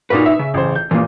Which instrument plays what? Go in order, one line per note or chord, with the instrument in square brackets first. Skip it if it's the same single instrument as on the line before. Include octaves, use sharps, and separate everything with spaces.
[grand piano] A#2 A#3 F#4 [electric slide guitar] D#4 B4
[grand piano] E5
[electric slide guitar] C#3
[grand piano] A1 C5
G6
[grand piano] A#2 [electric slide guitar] E3 A#3